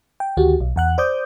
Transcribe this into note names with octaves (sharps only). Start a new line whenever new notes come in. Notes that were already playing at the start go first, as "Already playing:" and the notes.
G5
D2 D#3 F#4 G4
B1
E2 F#5 F#6
C5 D5 D6 D#6 G6